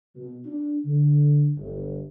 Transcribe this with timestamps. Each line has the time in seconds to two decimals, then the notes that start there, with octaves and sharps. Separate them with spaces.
0.15 B2
0.46 D4
0.85 D3
1.57 G1